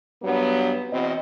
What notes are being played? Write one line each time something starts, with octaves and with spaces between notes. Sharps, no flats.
G2 F#3 B3
E2 B2 C4 D#5